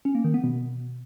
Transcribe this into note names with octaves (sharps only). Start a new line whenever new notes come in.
C#4
A#3
D#3
B3
B2